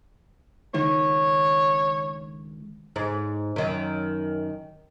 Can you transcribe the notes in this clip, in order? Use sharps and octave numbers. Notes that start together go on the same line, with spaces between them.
C#2 D#3 C#5
G#2
F#2 D#3